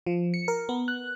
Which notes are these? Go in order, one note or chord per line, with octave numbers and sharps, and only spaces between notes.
F3
C#7
A#4
B3
F#6